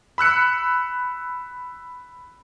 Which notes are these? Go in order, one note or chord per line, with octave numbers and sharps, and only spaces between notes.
B5 E6 F#6 C#7